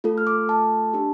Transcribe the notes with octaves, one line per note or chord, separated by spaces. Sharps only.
A3 F4 A4
F6
D6
A5
D4 G4